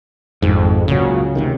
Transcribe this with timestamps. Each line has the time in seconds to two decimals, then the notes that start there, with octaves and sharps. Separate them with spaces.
0.42 G#1 F2 G#2
0.88 C#2 A#2 C#3 F#3
1.35 D2 C3 D#3